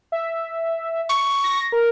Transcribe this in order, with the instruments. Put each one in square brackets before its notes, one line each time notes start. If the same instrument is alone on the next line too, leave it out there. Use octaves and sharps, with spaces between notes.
[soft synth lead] E5
[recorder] C#6
[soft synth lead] A#6
A#4